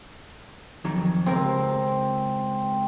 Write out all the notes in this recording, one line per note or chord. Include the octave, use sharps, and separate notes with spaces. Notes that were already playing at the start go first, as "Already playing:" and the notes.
F2 D#3 F#3
C#2 C4 A#4